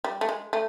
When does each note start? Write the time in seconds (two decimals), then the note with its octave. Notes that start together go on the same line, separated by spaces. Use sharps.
0.04 G3
0.21 A3
0.29 G#3
0.53 A3